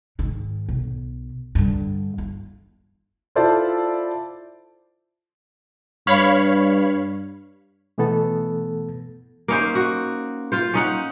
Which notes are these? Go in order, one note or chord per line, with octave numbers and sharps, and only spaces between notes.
G#2 D#3
B1
G2 D3
F4
E4 F4 A4 C5 D5 A5
G2 C#5 F5 B5
B2 E3 A3 B3 A4
A#3 C#4 D#4 C5
F#4
F4 C5
C#4 D#4 F#5